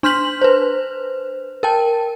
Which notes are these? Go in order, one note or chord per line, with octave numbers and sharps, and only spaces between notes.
D4 C6 F6 G6 B6 F#7
B4 C5
A#4 G5 A5